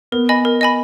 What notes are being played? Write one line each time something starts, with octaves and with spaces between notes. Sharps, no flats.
B3 A#4
D#5 G#5 B5
A#4
D#5 G#5 B5